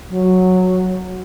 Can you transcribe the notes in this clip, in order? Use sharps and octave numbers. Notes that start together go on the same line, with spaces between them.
F#3